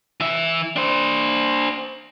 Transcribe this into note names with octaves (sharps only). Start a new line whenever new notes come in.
E3 E5
D4 C5